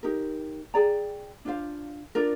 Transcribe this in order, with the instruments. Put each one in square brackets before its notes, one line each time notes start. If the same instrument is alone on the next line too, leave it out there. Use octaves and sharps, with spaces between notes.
[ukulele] D#4 G4 A#4
G#4 D5 G5 A#5
D4 F4 C5 F5
D4 F4 A#4 D5